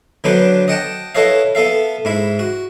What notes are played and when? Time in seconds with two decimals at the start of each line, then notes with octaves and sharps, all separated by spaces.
0.24 D3 F#3 B3 D4 B4 C5
0.68 D#5 F#5 G5 A5
1.15 E4 A4 B4 C#5 D#5 F5
1.55 B3 A4 E5 F5
2.05 G#2 E4 B5
2.39 F#4